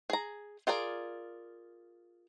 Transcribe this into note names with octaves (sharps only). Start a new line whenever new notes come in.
G#4 A#5
F4 G#4 A#4 D5